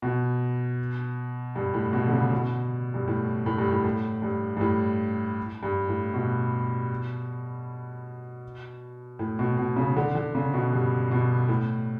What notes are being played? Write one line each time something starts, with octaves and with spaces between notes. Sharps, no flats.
B2
G2
A2
B2
D3
C#3
B2
G2
A2
A2
G2
A2
A2
G2
G2
A2
G2
A2
B2
A2
B2
B2
C#3
D3
D3
C#3
B2
G2
B2
A2